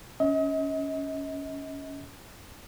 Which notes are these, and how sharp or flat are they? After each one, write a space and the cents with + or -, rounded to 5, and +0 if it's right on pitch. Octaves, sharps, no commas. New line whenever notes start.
C#4 +10 D#5 +40